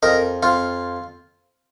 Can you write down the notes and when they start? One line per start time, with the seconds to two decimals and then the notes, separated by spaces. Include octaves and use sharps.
0.03 F2 A#4 D#5
0.43 F2 F4